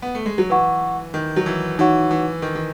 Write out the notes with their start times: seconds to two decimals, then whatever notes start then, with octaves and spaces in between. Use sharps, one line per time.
0.02 B3
0.15 A3
0.26 G#3
0.38 F#3
0.50 E3 B4 F#5 C#6
1.14 D#3
1.36 F#3
1.46 E3
1.79 E3 D#4 F#4 C#5 F#5 C#6
2.11 E3
2.42 D#3
2.55 D#3